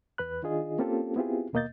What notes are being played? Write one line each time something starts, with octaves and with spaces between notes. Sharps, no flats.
E2 B4 B5 F#6
D#3 D4 F4 G#4 D#5
A#3 C4 C#4 F4 G4 A4
B3 C4 E4 F4 G4 G#4
D#2 B2 A#3 D#5 G6 A6